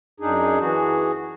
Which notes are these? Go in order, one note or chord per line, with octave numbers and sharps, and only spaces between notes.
F#2 D4 D#4 G#4
E3 F#4 G#4